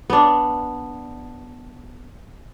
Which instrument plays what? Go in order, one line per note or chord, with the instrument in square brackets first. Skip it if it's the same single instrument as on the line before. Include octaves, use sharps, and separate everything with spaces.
[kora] B3 D4